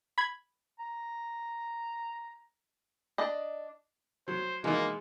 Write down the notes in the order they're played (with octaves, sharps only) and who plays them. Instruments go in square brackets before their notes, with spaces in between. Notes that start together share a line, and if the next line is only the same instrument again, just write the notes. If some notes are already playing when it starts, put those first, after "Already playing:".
[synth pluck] B5 G#6
[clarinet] A#5
[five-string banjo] D4 D5 D#5
[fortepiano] F#3 [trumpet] C5
[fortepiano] B2 E3 D#4 [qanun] G#3 [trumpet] A#3